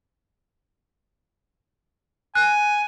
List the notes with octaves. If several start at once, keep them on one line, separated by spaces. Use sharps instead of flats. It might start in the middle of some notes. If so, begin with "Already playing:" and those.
G#5 F#6